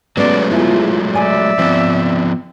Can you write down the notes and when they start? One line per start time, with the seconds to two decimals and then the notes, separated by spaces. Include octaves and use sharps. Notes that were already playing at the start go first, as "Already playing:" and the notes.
0.17 F#3 G#3 A3 B3 C#4 D5
0.51 E4 F4 G#4
1.15 D5 E5 G#5
1.59 F3 B3 C4